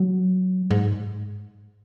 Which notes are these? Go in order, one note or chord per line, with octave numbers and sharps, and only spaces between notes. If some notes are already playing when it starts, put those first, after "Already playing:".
Already playing: F#3
G#2